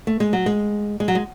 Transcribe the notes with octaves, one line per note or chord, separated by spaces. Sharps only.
A3
G#3
F#3
G#3
G#3
F#3
G#3